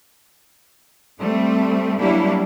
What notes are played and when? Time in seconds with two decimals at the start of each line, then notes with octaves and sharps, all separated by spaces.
1.19 G3 A3 C4
1.99 F#3 G3 A#3 D4 E4 G4